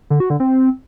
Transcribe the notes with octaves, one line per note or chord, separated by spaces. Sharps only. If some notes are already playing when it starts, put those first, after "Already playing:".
D3
F#4
D3
C4